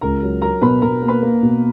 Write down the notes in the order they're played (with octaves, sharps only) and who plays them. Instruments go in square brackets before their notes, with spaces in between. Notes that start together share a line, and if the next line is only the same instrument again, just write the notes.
[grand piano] C#2 [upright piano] A#4 A#5
[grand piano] F#3
[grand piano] F#3 [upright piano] A#4 A#5
[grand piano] B2 [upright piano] B4 B5
[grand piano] B2 [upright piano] A#4 A#5
[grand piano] A#3
[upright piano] B4 B5
[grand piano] A#3
B2